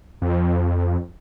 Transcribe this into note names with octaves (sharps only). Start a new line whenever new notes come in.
F2